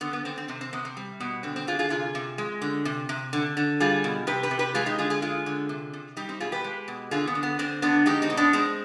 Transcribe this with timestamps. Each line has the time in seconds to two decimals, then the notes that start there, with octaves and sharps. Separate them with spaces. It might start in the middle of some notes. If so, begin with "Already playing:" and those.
0.01 D3 B3
0.13 B3
0.25 D3 C4
0.38 C4
0.48 C3 C4
0.61 C4
0.73 C3 B3
0.85 C4
0.97 G3
1.20 B2 B3
1.43 D3 C4
1.56 C4
1.67 D3 F4 G#4
1.79 F4 G#4
1.90 C3 F4 G#4
2.15 C3
2.38 G#3
2.62 D3
2.85 C3
3.09 C3
3.33 D3
3.57 D3
3.80 G3 F4 G#4
4.04 B2
4.27 C3 G4 B4
4.43 G4 B4
4.51 C3
4.59 G4 B4
4.74 G#3 F4 G#4
4.86 D#4 G4
4.98 D3 F4 G#4
5.10 F4 G#4
5.22 G#3 F4 G#4
5.46 D3
5.69 C3
5.93 C3
6.17 G3 D#4 G4
6.29 C4 D#4
6.40 B2 F4 G#4
6.52 G4 B4
6.64 G#3
6.88 B2
7.11 D3 F4 G#4
7.27 B3
7.35 D3
7.43 B3
7.59 D3 C4
7.82 D3 B3 D4
8.06 G#3 D#4 G4
8.22 C4 D#4
8.30 B2
8.37 B3 D4
8.53 G#3 C4